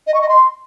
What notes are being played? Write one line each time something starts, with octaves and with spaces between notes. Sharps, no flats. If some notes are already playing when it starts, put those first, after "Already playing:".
D#5
C#6
D#5
C6